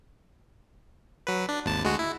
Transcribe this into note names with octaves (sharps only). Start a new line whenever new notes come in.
F#3 B4
D4
G#1 D#2 A5
D2 G#3 F#4
E4